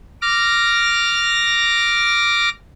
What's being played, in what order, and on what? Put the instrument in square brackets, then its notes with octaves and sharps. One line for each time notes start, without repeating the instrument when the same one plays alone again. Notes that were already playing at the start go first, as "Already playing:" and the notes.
[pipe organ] D6 F6 A#6